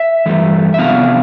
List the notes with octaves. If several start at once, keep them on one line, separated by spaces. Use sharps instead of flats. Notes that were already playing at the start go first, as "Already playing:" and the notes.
Already playing: E5
G2 E3 A3
E5
C3 F3 B3 D4 F5